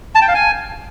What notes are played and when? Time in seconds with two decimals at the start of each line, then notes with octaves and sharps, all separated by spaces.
0.15 A5
0.22 G5
0.28 F5
0.35 G#5